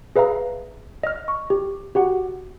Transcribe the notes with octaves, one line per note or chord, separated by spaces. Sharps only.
G#4 B4 E5 F5 A#5
D#5 F6
C#6
G4
F#4 G4 F#5